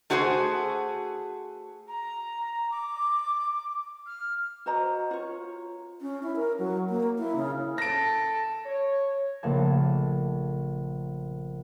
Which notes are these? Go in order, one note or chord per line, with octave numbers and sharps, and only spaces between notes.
A3 F#4 G#4 C5 D#5 G#5
A#5
D6
F6
F#4 C5 D#5 A#5
F4 C#5
C#4
E4
A#4
F#3
A#3
E4
C#3
A4 A#6 D7
C#5
A#1 C#3 A3 A#3 A5 G#6